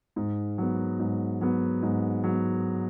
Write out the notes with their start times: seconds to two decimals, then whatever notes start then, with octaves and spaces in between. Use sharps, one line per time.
0.16 G#2
0.58 F#3 B3
0.99 G#2
1.41 F#3 B3
1.82 G#2
2.24 F#3 B3